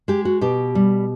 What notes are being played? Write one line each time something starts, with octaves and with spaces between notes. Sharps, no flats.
G#3 G4
F#4
B2 G4
G3